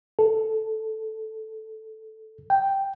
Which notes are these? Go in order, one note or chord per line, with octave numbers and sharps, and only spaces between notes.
A4
G5